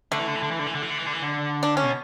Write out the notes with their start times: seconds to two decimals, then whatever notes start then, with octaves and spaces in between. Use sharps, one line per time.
0.12 D3 A3
0.19 E3
0.28 D3
0.35 E3
0.43 D3
0.51 E3
0.59 D3
0.67 E3
0.75 D3
0.83 E3
0.90 D3
0.98 E3
1.06 D3
1.13 E3
1.22 D3
1.63 D4
1.77 C#4
1.83 B2